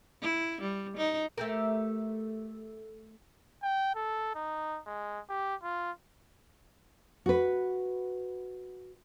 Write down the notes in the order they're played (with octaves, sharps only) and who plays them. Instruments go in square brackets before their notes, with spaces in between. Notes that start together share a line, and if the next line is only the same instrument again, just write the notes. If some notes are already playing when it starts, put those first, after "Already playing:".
[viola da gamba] E4
G3
D#4
[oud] A3 G4 A#4
[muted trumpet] G5
A4
D#4
G#3
G4
F4
[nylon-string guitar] F#4 B4